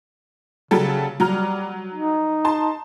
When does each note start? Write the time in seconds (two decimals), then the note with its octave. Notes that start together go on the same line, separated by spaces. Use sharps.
0.71 C#3 F#3 G3 A4
1.20 F#3 G3 A#5 F6
1.94 D#4
2.45 A5 C6